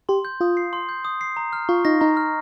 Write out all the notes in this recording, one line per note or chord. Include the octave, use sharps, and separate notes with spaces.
G4 C6
G6
F4 D#6
C7
C6
G6
D#6
C7
A#5
F6
F4 C#6
D#4 A#6
D#4 A#5
F6